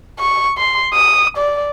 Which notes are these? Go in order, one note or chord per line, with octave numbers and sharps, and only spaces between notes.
C#6
C6
D#6
D5